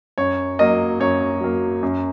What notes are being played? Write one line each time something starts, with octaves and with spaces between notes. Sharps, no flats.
F#2 C#5
F#3 A#3 D#5
F#2 C#5
F#3 A#3
F#2